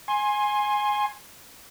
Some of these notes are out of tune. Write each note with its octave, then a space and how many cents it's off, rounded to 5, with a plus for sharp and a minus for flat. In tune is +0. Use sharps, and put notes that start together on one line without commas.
G#5 +0 C6 +25